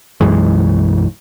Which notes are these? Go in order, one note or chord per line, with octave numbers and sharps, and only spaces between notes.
B1 F#2 E3 G#3